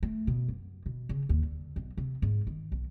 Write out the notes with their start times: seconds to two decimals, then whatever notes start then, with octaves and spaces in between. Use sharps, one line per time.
0.03 A3
0.27 B2
0.49 F#2
0.86 B2
1.09 C#3
1.29 D#2
1.43 D3
1.76 B1
1.98 C3
2.22 G#2
2.47 D#3
2.72 B1